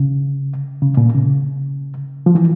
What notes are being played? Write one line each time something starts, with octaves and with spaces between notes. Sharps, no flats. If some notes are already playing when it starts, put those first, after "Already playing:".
Already playing: C#3
C#3
A#2
C#3
F3
E3